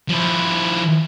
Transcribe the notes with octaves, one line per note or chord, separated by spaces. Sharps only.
F3 E4